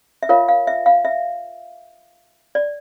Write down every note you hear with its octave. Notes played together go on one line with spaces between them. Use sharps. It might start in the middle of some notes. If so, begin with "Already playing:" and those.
E5
F4 A#4 C#5 F5
F5
E5
F5
E5
D5